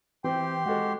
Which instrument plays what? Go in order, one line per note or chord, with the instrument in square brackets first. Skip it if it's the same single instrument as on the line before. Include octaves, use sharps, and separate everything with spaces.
[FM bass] E3 [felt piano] C4 [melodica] G4 C6 [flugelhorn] G5
[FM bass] G#3 [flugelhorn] F#4 [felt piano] A4 D#5 F#5